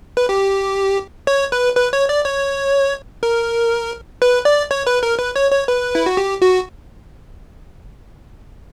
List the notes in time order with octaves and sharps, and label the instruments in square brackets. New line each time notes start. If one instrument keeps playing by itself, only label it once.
[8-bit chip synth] B4
G4
C#5
B4
B4
C#5
D5
C#5
A#4
B4
D5
C#5
B4
A#4
B4
C#5
C#5
B4
E4
F#4
G4
F#4